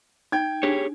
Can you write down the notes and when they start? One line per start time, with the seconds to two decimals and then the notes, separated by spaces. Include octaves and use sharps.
0.32 D#4 G5 G#6
0.63 D4 G4 G#4 C#5